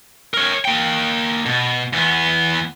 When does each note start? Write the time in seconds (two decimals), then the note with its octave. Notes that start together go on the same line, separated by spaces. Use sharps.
0.34 A#4 C#5
0.65 A#3 G5
1.46 B2
1.93 E2 B3